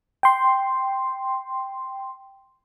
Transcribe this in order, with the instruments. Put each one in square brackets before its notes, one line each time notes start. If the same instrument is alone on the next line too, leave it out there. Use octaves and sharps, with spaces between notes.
[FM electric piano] G5 C6